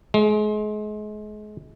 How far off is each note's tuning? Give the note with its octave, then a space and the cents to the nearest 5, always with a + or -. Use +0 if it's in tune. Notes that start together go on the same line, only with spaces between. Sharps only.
G#3 +30